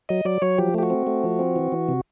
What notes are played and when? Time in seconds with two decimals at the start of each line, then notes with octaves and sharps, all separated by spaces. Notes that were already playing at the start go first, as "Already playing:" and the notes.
0.09 F#3 D#5
0.25 F#3 D5
0.42 F#3 C#5
0.58 F3 G4
0.74 A3 G4
0.83 F#4
0.90 C4
1.07 A3
1.24 F3
1.39 C4
1.56 E3
1.72 E3
1.88 C3